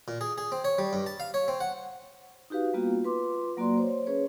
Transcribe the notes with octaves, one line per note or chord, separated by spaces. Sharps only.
A#2
G#4
G#4
C4
C#5
G3
G2
A5
F5
C#5
C4
F#5
D#4 F#4 G4 B4 F5
G3 A#3 B3 F4 F#4
F4 B4 C6 D6
F#3 A#3 F#4 D5 C6
C5 C#5
C#4 G#4 B4 C#5